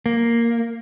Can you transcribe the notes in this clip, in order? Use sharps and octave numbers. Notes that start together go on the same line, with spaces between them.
A#3